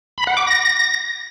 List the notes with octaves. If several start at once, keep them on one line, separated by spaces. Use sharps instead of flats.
B5
F#5
D6
A#6